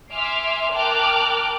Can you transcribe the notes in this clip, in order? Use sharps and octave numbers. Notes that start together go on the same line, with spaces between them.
E5 G#5 C6 D6 F6
A#4 G5 A5 D6 F6 F#6